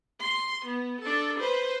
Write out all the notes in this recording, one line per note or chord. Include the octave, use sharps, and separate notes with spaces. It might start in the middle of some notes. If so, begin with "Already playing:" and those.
C6
B3
D4 A4
B4 C5